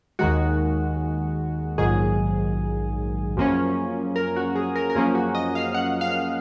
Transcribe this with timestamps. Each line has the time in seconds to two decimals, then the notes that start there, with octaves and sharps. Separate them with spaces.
0.19 D#2 D#3 G#3 F#4
1.78 A#1 G#2 D#3 F#3 G#4
3.37 F#2 F3 A#3 C#4
4.16 A#4
4.36 F#4
4.56 G#4
4.76 A#4
4.90 A#4
4.95 F#2 F3 A#3 C#4 G#4
5.15 F#4
5.35 D#5
5.55 F5
5.74 F#5
6.01 F5